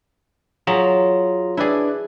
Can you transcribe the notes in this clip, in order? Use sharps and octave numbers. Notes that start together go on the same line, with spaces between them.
F#3 F4 G#4 A#5
D4 E4 G#4 B4 D5